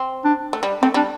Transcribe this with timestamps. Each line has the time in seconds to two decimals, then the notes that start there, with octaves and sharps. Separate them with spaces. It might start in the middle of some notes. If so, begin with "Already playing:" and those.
Already playing: C4
0.24 D4
0.53 A3
0.63 G3
0.82 A3 C4
0.94 G3 D4